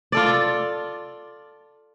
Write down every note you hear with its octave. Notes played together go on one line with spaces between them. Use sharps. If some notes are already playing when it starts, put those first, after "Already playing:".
F4 A4 D5